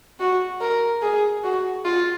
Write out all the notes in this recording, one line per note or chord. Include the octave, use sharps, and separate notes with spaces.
F#4
A#4
G#4
F#4
F4